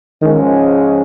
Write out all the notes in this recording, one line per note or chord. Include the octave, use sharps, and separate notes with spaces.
G#2 D#3 F3 G#3 C#4